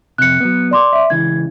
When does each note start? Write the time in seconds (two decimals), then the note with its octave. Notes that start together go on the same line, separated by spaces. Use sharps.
0.18 F2 C3 F#6 C#7
0.41 F#3 B3
0.71 D5 C6 D6
0.93 E5
1.10 C#2 C#3 E3 G#6